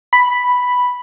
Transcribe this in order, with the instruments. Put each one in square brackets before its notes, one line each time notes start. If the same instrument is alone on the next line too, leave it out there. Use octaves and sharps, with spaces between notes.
[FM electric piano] B5